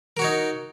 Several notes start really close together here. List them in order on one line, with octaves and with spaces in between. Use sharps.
A#4 F#4 C#5 D#4